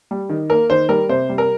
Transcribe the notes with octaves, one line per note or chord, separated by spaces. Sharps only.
G3
D#3
A#3 A#4
D#3 C5
G3 A#4
C3 C5
G3
A#4